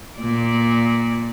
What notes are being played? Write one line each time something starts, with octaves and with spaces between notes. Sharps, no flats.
A#2 D5